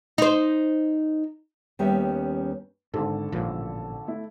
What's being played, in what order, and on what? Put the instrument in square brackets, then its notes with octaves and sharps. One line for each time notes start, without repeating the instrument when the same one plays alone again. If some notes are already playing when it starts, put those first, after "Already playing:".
[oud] D#4 C5
[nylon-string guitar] D#2 G3 B3 C#4 G4 E5
[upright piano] G#1 D3 A4 [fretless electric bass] G#2
[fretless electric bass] A1 A#2 F3
[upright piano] A3 E4